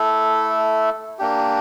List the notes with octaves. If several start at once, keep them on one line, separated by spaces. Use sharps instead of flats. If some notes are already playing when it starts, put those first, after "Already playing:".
Already playing: A3 E4 A4
A#3 D4 G4